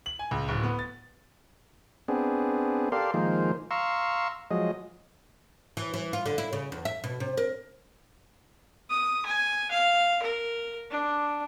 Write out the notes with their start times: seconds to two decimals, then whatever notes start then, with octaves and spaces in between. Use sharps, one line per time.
0.06 F#7
0.19 G#5
0.31 C#2
0.48 D1
0.63 B3
0.79 A6
2.08 B3 C4 D4 G#4
2.92 G4 A4 A#4 D5 F5 C6
3.14 D#3 F3 G#3 A#3 C5
3.71 F5 A#5 C6 C#6 E6
4.51 F3 F#3 G#3 D#5
5.77 E3
5.94 E3
6.13 F4
6.26 D3
6.38 E4
6.53 C#3
6.72 E2
6.85 E5
7.04 B2
7.20 C3
7.37 A#4
8.90 D#6
9.26 G#5
9.71 F5
10.22 A#4
10.90 D4